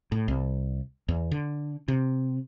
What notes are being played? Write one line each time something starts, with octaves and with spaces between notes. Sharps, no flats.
A2
C2
E2
D3
C3